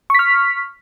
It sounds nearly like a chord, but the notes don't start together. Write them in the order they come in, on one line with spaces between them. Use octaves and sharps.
C#6 B6 F6